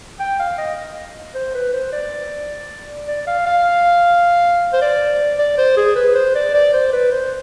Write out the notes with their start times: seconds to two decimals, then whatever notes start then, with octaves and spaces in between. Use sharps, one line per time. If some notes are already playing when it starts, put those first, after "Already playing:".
0.20 G5
0.40 F5
0.58 D#5
1.35 C5
1.55 B4
1.74 C5
1.93 D5
3.08 D5
3.27 F5
3.47 F5
4.73 C5
4.82 D5
5.39 D5
5.58 C5
5.77 G#4
5.96 B4
6.16 C5
6.35 D5
6.54 D5
6.74 C5
6.93 B4
7.12 C5